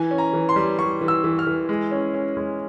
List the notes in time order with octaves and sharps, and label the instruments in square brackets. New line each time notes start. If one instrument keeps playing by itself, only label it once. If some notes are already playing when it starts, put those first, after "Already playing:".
Already playing: [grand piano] E3 G#5
C#4
A#5
E3
C6
G3
G3 C#6
E3
E6
E3
F6
E3
G#3
C#4
C#4
G#3